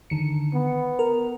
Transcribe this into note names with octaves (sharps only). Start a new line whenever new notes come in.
D3 D#3 C#7
B3
A#4